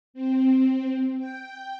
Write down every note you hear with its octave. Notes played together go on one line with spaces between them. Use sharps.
C4
G5